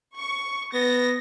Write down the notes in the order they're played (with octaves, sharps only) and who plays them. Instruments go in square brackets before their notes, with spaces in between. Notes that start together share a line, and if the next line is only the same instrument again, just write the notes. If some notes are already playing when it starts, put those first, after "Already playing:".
[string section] C#6
[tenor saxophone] B3 [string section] A#6